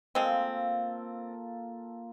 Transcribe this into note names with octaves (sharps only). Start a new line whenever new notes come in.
G#3 A#3 C4 F4 A4